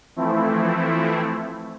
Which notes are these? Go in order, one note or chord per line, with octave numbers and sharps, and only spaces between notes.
E3 F3 A3 C4 E4